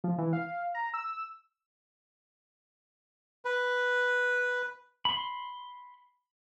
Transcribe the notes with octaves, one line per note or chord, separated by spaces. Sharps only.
F3
E3
F5
A#5
E6
B4
B5 C6